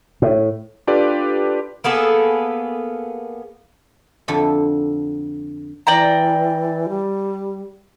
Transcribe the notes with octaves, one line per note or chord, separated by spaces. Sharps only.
A2
D4 F4 G4 A4 B4 D5
A#3 B3 G#4 A4
F2 D3 A4 E5
E3 D5 G5 A#5
G3